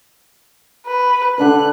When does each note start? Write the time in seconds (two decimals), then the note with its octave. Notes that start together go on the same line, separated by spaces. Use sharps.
0.87 B4
1.38 D3 D4 B4 F#6